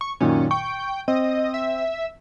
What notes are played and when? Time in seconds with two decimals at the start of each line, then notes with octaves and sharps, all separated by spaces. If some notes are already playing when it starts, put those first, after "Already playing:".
0.01 C#6
0.20 F#2 A#2 D#3 C#4
0.51 G5 C#6
1.08 C4 D#5
1.54 E5